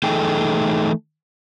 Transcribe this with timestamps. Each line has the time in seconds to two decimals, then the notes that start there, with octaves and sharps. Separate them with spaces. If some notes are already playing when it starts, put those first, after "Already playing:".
0.03 E3 A3 D#4 G#4 A4 G5